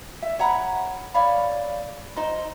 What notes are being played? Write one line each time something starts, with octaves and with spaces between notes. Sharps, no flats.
E5
C#5 F#5 A#5 B5
C#5 D5 F5 B5
D#4 C5